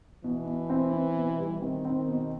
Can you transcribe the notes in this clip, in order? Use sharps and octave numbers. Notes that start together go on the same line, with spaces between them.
B2 E3
B2
C4
C4
B2
G3
D#3 C4
C4
D#3
B2